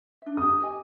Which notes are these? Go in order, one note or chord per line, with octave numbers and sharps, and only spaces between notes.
D4 E5
D4 G4 D#6
G4 D#5 G#5